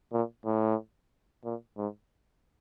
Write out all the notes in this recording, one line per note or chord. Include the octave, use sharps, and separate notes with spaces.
A#2
A2
A#2
G#2